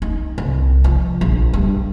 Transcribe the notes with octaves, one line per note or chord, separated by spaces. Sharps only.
D#4
C2
F3
A#1
G2